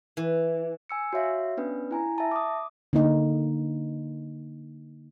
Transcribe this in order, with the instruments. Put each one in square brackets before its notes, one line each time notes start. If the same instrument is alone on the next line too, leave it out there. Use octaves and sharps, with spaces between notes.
[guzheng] E3
[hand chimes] G#5 E6 C#7
F#4 C#5 E5 F5
B3 C#4 D4 B4
E4 G#5 A#5
E5 A5
D6 D#6
[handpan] D3 A#3 D#4